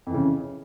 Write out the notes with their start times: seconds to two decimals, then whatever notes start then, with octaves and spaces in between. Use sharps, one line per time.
0.07 F2
0.10 E3
0.14 C#3